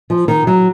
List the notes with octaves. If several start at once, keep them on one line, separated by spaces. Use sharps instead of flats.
F3
D#3
F#3